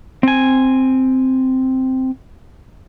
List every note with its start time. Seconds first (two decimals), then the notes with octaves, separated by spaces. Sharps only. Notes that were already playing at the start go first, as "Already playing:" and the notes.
0.23 C4 G#5